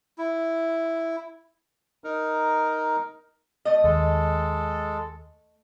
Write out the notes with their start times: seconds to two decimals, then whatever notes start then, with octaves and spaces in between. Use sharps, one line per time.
0.18 E4
2.04 D#4 A#4
3.65 A3 D#5
3.84 D#2 G#3 A4